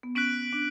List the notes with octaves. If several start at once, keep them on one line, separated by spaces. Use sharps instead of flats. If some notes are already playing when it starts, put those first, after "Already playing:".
B3
C#4 F#6 B6 D7 F#7
D4